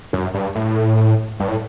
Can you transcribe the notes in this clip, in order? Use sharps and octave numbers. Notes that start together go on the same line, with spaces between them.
F#2
G2
A2
G2
A2